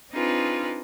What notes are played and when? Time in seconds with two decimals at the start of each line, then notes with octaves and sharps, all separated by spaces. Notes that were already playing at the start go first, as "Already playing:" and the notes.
0.11 C4 D4 D#4 F4 G#4 B4